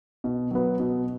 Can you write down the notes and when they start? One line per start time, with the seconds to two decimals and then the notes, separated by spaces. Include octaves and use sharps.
0.24 B2
0.51 F#3 B3
0.80 B2